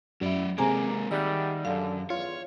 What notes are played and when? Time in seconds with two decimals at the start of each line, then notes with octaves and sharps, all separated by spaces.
0.21 F#2 F#3 E4 D5
0.58 C3 G#3 A#3 G#4 G#5 A#5 D6
1.11 D#3 G3 E5 F#5
1.65 F#2 D3 F5
2.10 E2 F4 C#5